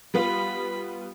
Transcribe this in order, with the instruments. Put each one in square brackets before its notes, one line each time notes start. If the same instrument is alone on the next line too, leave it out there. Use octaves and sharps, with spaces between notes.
[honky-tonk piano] G3 B3 F4 [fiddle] B5